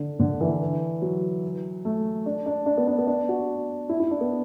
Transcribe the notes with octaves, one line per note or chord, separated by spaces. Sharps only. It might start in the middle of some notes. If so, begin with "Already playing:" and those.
Already playing: D3
D3
E3
F#3
A3
D4
D4
D4
B3
D4
B3
D4
F#4
E4
E4
D4
B3